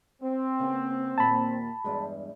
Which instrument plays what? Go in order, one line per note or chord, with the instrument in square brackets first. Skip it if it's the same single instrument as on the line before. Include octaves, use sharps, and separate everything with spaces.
[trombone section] C4
[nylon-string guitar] C#3 A#3 B3
[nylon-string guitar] D#2 A#2 [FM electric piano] A5 B5
[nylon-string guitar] E2 G2 G#3